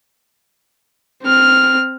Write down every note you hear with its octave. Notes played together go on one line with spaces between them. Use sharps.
C4 F6